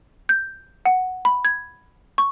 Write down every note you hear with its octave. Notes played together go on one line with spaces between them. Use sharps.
G6
F#5
B5
G#6
C#6